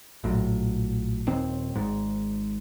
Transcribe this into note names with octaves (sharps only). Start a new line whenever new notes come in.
A#1 A2 F#3
D#1 D#2 C4
G#1 G#2